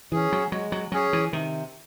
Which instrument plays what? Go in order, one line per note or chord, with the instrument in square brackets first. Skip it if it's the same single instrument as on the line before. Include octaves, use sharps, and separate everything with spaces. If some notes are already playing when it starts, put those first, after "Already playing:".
[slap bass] E3 [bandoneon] C#4 G#4
[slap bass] F#3
[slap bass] F#3 [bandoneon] G#3
[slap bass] F#3
[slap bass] F#3 [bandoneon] C#4 G#4
[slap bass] E3
[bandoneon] C3 [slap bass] D#3